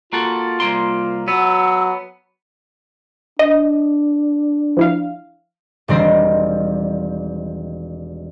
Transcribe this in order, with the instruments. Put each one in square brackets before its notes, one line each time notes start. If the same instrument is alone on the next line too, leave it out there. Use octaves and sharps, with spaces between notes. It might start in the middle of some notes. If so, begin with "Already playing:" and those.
[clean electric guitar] A#3 F#4 A4 [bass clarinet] F4
[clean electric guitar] C2 A#3 C6
[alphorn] F#3 [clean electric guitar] B3 [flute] E6
[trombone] D4 [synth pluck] D#5
[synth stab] F3 E4 F5
[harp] E1 D#3 G3 C4 C6 A#6